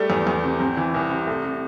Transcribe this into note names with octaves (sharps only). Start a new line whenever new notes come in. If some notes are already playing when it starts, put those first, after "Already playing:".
Already playing: G3 A3
E2
E2
C3
E2 C4
E3
C2
C3
C2 A3
C3